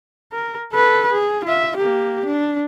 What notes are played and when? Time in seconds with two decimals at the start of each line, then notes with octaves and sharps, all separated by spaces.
0.32 A#4
0.72 A4 B4
1.13 G#4
1.45 F4 E5
1.77 A#3 G4
2.26 D4